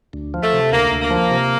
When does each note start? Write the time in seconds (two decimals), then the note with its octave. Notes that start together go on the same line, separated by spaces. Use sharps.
0.13 D2
0.34 F3
0.43 A3
0.53 C3
0.72 D2 A#3
0.91 D2
1.02 A#3
1.11 F3
1.31 C3